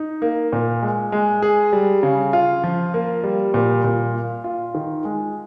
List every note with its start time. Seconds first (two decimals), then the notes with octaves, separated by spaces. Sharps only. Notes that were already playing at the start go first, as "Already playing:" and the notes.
Already playing: D#4
0.22 A#3
0.53 A#2
0.82 G#3
1.12 G#3
1.42 G#4
1.73 G3
2.03 C#3
2.33 F4
2.64 F3
2.94 A#3
3.24 G3
3.54 A#2
3.84 A#2
4.14 F4
4.44 F4
4.75 D#3
5.05 G#3